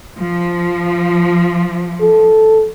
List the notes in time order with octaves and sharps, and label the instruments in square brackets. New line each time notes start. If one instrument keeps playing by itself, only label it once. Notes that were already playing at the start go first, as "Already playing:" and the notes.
[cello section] F3
[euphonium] A4